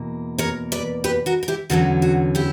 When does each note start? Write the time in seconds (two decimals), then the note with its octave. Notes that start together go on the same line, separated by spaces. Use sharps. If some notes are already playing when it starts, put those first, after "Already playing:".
Already playing: E2 B2 A#3
0.38 A#4 C#5
0.72 B4 D5
1.04 G4 B4
1.26 F#4 A#4
1.43 A#4
1.48 E4 G4
1.70 E2 D3 F#3 C#4 F#4 A#4
2.02 F#4
2.35 E4 G4